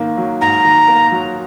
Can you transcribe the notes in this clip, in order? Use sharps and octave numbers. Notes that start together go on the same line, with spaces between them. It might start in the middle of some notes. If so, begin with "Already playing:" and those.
Already playing: G#2 D#3 A#3
F#3
G#2 A#5
D#3
A#3
F#3